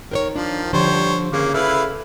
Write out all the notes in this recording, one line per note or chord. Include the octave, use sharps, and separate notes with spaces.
D#3 A#4 C5 C#5
F3 D4
D3 F3 G3 C5 C#5
C#3 A#3
E4 A4 B4 F5